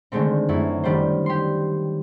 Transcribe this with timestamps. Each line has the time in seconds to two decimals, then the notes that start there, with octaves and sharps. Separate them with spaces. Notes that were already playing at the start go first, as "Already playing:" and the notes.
0.12 D3 D#3 G#3 A3 C4
0.49 F#2 A3 E4
0.84 D#3 G3 D4 C5
1.26 G4 C6